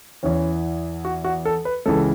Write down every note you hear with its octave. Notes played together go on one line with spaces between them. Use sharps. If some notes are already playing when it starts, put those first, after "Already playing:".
E2 E3 C#4
F#4
F#4
A4
B4
C#2 C#3 E3 A4